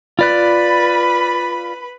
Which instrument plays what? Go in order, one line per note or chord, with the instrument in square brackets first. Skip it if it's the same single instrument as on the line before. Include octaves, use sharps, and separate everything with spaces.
[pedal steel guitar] F4 D5 F#6 [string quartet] B4 B5